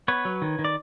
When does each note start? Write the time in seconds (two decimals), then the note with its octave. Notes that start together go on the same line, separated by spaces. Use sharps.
0.08 B3 B4 C#5
0.25 F#3
0.42 D#3
0.59 D#3
0.65 D5